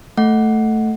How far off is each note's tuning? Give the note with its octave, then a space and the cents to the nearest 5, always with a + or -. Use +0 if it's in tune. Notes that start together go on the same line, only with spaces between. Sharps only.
A3 +0 F#5 +0